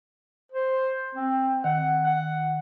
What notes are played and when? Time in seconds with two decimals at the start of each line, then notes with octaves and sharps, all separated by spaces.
0.52 C5
1.15 C4
1.64 D#3 F#5
2.06 F#5